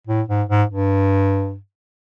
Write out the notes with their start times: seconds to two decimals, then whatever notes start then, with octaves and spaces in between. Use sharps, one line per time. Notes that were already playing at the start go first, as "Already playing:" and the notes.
0.07 A2
0.28 G#2
0.49 G#2
0.70 G2